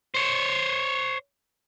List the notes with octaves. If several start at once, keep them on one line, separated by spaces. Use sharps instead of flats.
C5 C#5